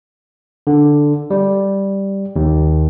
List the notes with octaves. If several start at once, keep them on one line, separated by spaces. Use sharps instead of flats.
D3
G3
D#2